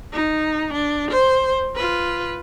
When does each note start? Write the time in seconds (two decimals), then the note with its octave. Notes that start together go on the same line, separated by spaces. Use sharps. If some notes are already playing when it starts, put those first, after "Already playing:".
0.13 D#4
0.73 D4
1.11 C5
1.76 F4 B4